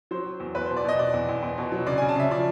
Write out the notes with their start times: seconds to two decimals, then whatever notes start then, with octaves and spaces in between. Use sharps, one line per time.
0.11 F#3 C5
0.26 F#3
0.40 E2
0.55 E2 B4
0.66 B2 C5
0.77 D5
0.84 B2 D#5
0.99 B2 D5
1.14 E2
1.29 E2
1.43 E2
1.58 B2
1.72 F#3
1.87 C#3 D5
1.98 C#3 G#5
2.09 A5
2.16 C#3 E5
2.30 F3 D5